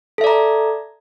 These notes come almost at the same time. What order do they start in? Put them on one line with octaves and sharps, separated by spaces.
A4 E5 D5 A#5